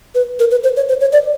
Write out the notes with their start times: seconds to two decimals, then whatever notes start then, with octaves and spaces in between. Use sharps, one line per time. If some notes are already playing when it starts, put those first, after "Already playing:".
0.15 B4
0.40 A#4
0.51 B4
0.64 C5
0.77 C#5
0.89 C5
1.01 C#5
1.13 D5